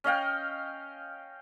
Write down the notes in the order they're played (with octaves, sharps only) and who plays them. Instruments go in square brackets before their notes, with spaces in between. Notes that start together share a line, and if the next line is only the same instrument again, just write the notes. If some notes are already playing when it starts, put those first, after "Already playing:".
[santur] C#4 D#5 F5 G5